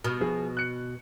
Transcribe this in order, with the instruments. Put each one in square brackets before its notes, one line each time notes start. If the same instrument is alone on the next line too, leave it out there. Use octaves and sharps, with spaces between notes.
[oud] B2 [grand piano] F6
[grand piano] F3 G#4
F#6 C#7